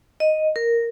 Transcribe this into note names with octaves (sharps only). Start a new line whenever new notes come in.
D#5
A#4